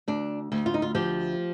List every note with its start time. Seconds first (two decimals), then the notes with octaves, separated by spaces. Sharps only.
0.08 D2 D4
0.52 D2
0.66 F4
0.74 D#4
0.82 F4
0.95 F3 G4